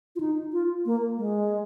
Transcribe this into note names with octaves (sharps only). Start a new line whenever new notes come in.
F4
D#4
F4
A#3
G#3